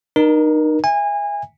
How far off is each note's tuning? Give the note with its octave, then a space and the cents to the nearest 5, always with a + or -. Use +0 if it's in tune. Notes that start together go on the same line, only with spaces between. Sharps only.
D#4 -30 A#4 +25
E5 +5 G#5 -25